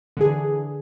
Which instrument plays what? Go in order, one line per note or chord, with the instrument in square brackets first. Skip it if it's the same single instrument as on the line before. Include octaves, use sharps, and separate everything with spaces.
[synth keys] D3 E3 G#4